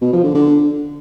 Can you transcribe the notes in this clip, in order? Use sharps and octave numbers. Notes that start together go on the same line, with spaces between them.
B2
F3
D3
D3